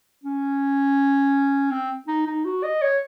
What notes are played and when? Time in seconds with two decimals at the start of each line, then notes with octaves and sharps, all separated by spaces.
0.24 C#4
1.71 C4
2.08 D#4
2.26 D#4
2.45 F#4
2.63 D#5
2.82 C#5